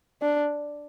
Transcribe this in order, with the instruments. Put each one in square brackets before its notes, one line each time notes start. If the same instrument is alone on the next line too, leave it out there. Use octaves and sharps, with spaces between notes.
[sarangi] D4